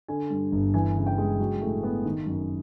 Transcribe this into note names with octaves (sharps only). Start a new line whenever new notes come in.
D3 G#5
G2
G1
E3 G#5
C#3
G5
G#3
F#3
A2
B3
D#3
F#2